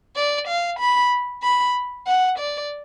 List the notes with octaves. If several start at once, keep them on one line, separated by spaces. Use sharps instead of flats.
D5
F5
B5
B5
F#5
D5